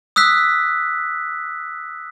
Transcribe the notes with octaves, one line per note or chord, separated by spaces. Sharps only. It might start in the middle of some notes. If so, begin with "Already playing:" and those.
D#6 E6 F#6 B6